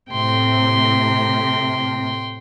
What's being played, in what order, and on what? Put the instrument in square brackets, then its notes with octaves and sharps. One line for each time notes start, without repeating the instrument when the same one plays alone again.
[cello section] A2 C3 [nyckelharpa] G5 C6